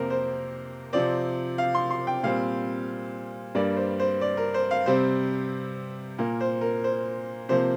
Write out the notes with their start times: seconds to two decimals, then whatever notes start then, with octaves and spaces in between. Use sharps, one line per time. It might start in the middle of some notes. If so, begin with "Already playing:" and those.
Already playing: F2 C3 A#3 A#4 C5
0.10 C5
0.93 C3 F3 C4 D5
1.58 F5
1.75 C6
1.90 C6
2.07 G5
2.23 A#2 G3 C4 F5
3.55 G2 G3 A#3 D5
3.77 C5
4.00 C5
4.21 D5
4.37 A#4
4.54 C5
4.71 F5
4.86 C3 G3 C4 C5
6.18 A#2 A#3 A#4
6.41 C5
6.61 A#4
6.84 C5
7.49 C3 F3 A#3 C5